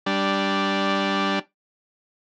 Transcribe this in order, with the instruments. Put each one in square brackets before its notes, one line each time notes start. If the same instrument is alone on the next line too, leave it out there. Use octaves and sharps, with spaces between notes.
[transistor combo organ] G3 D4